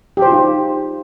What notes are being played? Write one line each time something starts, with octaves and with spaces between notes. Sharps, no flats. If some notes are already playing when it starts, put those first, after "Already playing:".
G4
C5
F4
D#4